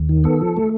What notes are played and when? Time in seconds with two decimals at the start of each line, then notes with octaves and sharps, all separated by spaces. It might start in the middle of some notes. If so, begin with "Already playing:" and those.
Already playing: D#2
0.09 D#3
0.24 B3 A4
0.41 F3
0.57 A3